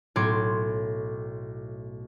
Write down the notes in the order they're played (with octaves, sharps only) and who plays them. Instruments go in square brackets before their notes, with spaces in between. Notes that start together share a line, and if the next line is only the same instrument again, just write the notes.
[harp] B1 A2 C#5 C6 D6 G#6